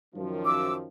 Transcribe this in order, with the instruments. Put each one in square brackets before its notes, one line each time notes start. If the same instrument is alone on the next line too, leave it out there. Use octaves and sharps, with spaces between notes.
[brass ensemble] F#2 D#3 F3
[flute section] D6 E6